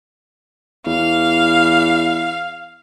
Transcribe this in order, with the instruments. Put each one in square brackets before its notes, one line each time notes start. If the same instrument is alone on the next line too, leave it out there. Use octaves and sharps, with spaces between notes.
[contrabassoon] E2 [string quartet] F5